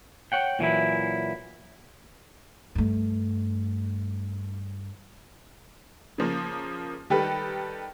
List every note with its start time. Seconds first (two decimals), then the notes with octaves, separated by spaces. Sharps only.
0.32 C#5 F#5 G5
0.59 A#2 E3 F#3 E4
2.75 G2 A3
6.18 C#3 F3 A#3
7.10 D#3 G3 G4 A4 B4